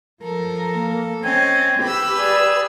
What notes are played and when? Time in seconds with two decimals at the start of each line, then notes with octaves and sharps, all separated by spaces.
0.23 F3 A4 A#4
0.74 A#3
1.23 C4 C#4 D#5 G5 G#5
1.82 G4 B4 B5 E6
2.18 G#4 D5